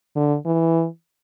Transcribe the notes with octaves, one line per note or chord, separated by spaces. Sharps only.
D3
E3